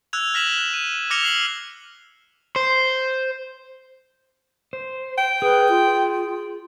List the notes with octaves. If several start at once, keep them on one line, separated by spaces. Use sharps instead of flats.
E6 F#6 G#6 F7
F6 A#6 B6 E7 F#7
F#6
D#7
D6 F6 A#6 C#7 F7 G7
F6 C7 F#7
C5
C5
G5
G#4 B4
F4